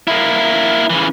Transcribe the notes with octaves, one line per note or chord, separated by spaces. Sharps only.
A#3 E4
C#3 E3